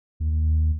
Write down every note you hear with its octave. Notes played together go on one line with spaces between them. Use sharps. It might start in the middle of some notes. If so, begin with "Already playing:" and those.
D#2